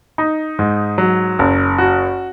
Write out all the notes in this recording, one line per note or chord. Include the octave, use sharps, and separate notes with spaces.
D#4
G#2
F#3
F#1
F#4